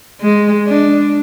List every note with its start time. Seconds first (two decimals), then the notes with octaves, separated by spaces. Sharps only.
0.21 G#3
0.68 D4